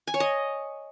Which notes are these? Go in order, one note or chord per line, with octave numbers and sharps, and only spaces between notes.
G#5
C#5
D#5